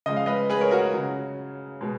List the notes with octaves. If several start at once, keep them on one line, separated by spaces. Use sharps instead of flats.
C#3 F3 G#3 D#5
F5
B4 D#5
G#4 B4
A#4 C#5
F#4 A#4
C#3 F#3
B2 G#3